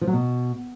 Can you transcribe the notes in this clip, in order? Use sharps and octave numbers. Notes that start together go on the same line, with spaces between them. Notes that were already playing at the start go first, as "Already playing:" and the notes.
F3
F#3
B2